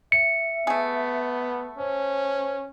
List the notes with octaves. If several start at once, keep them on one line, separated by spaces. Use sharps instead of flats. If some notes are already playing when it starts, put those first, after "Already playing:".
E5 C#7
A3 B3 G#4
C#4 C5